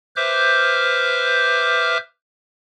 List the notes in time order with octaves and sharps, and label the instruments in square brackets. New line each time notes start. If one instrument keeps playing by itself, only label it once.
[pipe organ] B4 C5 E5 D6 F6 G6